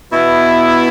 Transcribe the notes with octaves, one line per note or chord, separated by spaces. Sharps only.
B2 B3 E4